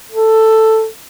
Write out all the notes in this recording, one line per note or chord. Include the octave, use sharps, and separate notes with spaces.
A4